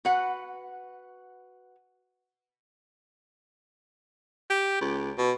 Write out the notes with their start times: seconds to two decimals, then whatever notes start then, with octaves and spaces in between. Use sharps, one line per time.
0.05 F#4 B4 F#5
4.50 G4
4.81 C#2
5.18 B2